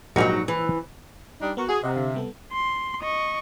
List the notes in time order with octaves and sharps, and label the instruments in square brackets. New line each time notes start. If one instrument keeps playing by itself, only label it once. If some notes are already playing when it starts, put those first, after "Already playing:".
[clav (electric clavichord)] A#1 G#2 G3 [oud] F#3 D#4 F#4
[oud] E3
[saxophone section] G3 D4 D#4
[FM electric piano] B3 A#4 C#6 [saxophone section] F#4
[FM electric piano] F#4 [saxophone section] G#4
[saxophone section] C3 [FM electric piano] D#5 F#5 A#5
[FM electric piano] D3 F5
G3 B3 A4
[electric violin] C6
D#5 C#6